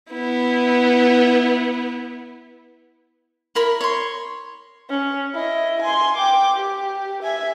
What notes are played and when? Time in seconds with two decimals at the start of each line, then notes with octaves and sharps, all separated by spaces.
0.13 B3 E4
3.55 E4 A#4 B5
3.81 C#5 C6
4.90 C#4
5.34 E4 D#5
5.82 G#5 C6
6.17 G5 D6
6.56 G4
7.22 E5 G#5